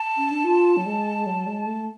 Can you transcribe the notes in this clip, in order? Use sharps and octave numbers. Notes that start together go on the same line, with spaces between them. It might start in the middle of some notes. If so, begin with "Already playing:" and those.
Already playing: A5
C#4
D4
F4
F#3
G#3
F#3
G#3
A3